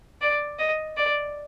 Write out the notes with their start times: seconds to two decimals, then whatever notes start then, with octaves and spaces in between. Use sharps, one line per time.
0.21 D5
0.59 D#5
0.97 D5